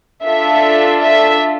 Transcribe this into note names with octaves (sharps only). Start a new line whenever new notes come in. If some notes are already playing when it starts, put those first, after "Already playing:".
D4 F4 A4 E5
E5